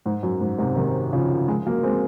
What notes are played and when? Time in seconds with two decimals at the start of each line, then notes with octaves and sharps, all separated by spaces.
0.06 G#2
0.23 F#2
0.41 G#2
0.58 G#2 C3
0.76 C3 D#3
1.13 C#3 F3
1.48 F3 G#3
1.65 F#3 A#3
1.83 G#3 C4